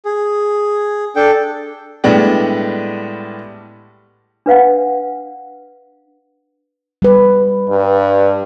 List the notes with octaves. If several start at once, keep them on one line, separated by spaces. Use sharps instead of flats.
G#4
D4 A4 G5
A2 G3 G#3 B3 D4 G4
D4 B4 F5 F#5
G3 B4
G2